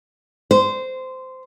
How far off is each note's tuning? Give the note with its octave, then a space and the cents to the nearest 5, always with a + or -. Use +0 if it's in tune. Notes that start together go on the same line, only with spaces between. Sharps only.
C5 -15